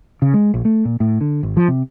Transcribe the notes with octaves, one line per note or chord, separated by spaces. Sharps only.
C#3
G#3
A#1
A3
A#2
A2
D3
G#1
F3
C3